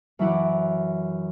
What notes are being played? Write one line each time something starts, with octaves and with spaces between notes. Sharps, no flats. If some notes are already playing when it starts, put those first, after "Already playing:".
F#2 E3 E4 F#5 D6